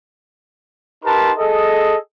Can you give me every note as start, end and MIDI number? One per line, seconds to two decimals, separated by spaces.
1.04 1.32 63
1.04 1.32 67
1.04 1.32 70
1.04 1.32 71
1.04 1.32 81
1.04 1.32 84
1.37 1.96 68
1.37 1.96 69
1.37 1.96 75